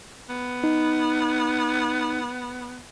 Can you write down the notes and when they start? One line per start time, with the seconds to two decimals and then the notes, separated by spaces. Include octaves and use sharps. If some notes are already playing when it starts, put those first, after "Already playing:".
0.29 B3
0.64 D#4